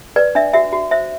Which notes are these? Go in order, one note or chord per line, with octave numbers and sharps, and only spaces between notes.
B4 D5
D4 E5
F#4 E5
F#4
C5 E5